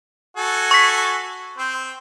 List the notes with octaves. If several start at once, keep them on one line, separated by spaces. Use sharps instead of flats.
F#4 A4 G#5
C#6 B6
C4 C5